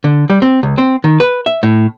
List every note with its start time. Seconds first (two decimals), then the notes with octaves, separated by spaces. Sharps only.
0.04 D3
0.30 G3
0.42 C4
0.63 C#2
0.78 C4
1.04 D#3
1.20 B4
1.46 E5
1.63 A2